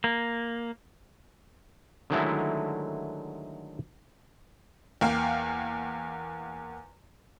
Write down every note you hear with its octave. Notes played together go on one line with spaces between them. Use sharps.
A#3
D3 D#3 F#3 G#3 A3 E4
E2 A#3 F5 G5